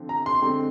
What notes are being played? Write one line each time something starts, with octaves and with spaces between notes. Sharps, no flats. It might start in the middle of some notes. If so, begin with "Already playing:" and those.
Already playing: D3 F3 C4
A#5
C6
D3 G#3 C4